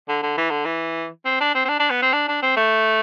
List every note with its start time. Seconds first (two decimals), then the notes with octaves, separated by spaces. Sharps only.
0.08 D3
0.23 D3
0.38 E3
0.50 D3
0.65 E3
1.25 C4
1.40 D4
1.55 C4
1.65 C4
1.69 D4
1.79 D4
1.90 B3
2.02 C4
2.13 D4
2.28 D4
2.42 C4
2.57 A3